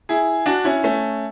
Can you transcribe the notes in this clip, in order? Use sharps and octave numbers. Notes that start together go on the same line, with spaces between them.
E4 G#4
D4 F#4
C#4 E4
A3 C#4